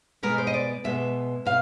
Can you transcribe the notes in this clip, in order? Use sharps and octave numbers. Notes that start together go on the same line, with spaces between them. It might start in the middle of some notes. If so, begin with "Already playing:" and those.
B2 G#3 B3 A#4
C5
D#5
D5
B2 G#3 B3 E5
B2 F5